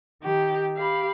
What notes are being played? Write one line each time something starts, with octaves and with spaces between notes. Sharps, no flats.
D#3 G4
G4 F5 B5